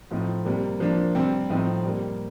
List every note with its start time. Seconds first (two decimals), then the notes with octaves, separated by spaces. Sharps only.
0.11 A2 F3 C4 D#4
0.45 C3 G3 A#3
0.80 F3 A#3 D4
1.15 C3 G3 C4
1.50 A2 F3 C4 D#4
1.84 C3 G3 A#3